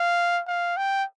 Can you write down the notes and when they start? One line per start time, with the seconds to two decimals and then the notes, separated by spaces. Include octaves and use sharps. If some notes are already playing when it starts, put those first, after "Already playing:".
Already playing: F5
0.47 F5
0.77 G5